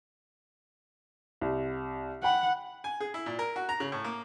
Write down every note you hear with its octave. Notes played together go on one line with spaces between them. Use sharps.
C2
F#5 G5 B5
G#5
G#4
E4
A#2
A#4
F#4
A#5
C#3
A2
A#3